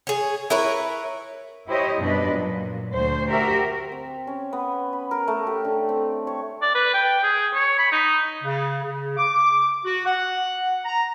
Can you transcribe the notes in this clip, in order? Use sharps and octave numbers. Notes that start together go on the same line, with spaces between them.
G#4 C#5
E4 A#4 B4 C#5
E4 G4 C5 C#5 D#5
F#2 B2 G3 D4 B4 D#5
A#2 F#3
D2 C5
F#4 G4 A#4 E5
C4
C#4
B3
B5
A#4
A3
G4
D3
C4
C#5
D5
B4
G5
G#4
C#5
B5
D#4
C#3
C#3
D6
F#4
F#5
A#5